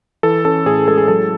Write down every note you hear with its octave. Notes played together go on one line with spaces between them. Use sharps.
E3 A4
C#4 A4
A2 G#4
G#3 A4
G#4
F#3 A4